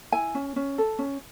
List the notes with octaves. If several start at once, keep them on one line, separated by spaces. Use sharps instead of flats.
E4 G#5
C#4
C#4
A4
C#4